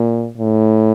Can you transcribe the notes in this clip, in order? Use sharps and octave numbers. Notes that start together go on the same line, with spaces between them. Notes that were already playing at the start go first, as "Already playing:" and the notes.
Already playing: A#2
A2